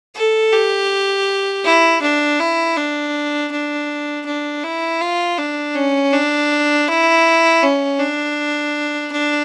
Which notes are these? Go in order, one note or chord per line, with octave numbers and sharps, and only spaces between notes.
A4
G4
E4
D4
E4
D4
D4
D4
E4
F4
D4
C#4
D4
E4
C#4
D4
D4